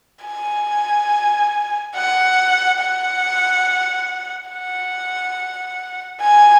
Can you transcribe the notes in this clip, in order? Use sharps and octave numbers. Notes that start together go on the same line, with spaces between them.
G#5
F#5
F#5
F#5
G#5